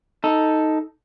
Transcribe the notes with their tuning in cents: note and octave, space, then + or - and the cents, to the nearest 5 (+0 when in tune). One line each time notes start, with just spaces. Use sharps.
D#4 +10 A4 +0